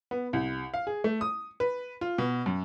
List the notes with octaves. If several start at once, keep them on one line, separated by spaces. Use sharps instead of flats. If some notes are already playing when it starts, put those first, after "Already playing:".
B3
C2
F5
G#4
A3
D#6
B4
F4
B2
F#2